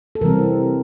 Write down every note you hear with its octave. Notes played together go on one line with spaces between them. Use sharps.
A4
C3 E3 G3 C4 A#4